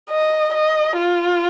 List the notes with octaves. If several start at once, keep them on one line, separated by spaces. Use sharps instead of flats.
D#5
D#5
F4